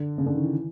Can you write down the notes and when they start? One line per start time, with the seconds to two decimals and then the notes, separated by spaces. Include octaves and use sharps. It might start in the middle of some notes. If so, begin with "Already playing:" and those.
Already playing: D3
0.18 C#3
0.26 D3
0.34 D#3
0.43 E3